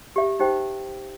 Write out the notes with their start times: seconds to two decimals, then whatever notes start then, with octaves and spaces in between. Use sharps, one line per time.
0.16 G4 E5
0.40 D#4 G4 C5 G5